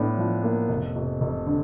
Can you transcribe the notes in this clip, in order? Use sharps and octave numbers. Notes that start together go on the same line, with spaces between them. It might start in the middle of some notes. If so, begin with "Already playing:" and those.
Already playing: A2 B3 D4
F3
A#3
F1
F1
F1
D3